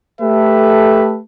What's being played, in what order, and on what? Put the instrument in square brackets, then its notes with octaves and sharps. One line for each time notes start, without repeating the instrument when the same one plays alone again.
[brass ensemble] A3 G4 A4 B4 E5